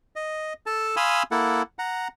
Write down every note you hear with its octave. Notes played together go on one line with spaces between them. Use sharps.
D#5
A4 A5
F5 G#5 B5 C6 D#6 E6
A#3 E4 A4 F#5
F#5 A#5